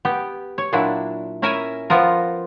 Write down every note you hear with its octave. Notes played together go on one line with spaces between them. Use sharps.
B3 G4
C#5
A#2 F#3 D4 E4
C#4 E4 A#4 E5 G#5
F3 B3 F4 A#4